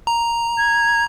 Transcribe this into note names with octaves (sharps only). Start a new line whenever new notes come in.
A#5
G#6